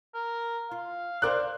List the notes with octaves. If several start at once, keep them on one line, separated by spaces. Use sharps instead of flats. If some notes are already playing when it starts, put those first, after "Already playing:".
A#4
F4 F5
A#4 C5 D5 D6 F#6